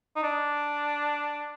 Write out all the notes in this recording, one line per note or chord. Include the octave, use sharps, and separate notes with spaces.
D#4
D4